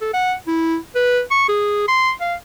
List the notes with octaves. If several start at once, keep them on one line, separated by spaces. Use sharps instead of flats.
A4
F#5
E4
B4
C#6
G#4
C6
F5